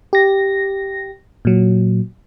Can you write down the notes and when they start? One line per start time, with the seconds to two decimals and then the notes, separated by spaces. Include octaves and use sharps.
0.13 G4 A#6
1.45 A#2 F#3